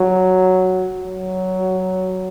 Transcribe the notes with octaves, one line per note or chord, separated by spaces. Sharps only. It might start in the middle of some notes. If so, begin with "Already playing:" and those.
Already playing: F#3
F#3